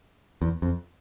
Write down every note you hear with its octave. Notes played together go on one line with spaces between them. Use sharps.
E2
F2